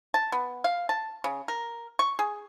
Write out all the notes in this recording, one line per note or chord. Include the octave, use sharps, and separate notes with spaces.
A5
B3
F5
A5
C#3
A#4
C#6
G#4